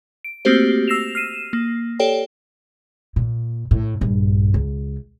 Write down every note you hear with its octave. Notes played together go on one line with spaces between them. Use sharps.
D7
A3 A#3 C4 F#4 G4 C5
E6 A#6 C7 E7 F7
F6 C7 D#7 E7
A#3
G4 A4 C#5 D5 G5
A#2
A2
A#1 G2
C#2